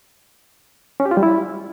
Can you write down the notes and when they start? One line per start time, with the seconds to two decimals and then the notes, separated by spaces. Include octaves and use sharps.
1.00 C#4
1.06 G4
1.11 F4
1.17 G3
1.23 E4